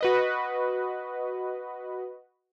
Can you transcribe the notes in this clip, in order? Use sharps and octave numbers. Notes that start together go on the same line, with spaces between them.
F#4 B4 D#5